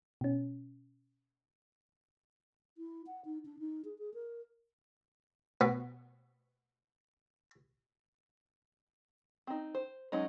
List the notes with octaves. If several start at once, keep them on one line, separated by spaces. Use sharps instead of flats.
B2 C#4
E4
F#5
D#4
D4
D#4
G#4
G#4
A#4
B2 B3
C4 D#4
C5
F#3 G#3 C#4 D#4